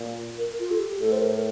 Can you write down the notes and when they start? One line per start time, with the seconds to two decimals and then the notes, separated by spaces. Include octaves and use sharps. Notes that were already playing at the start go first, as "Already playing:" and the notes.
Already playing: A#2
0.38 A#4
0.59 F4
0.71 A4
0.79 G4
1.00 A2 A4
1.12 C5
1.21 A#4